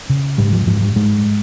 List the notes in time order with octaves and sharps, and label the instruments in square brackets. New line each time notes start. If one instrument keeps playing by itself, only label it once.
[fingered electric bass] C#3
G#2 G3
F3
G#2 F3
G3
G#2 G#3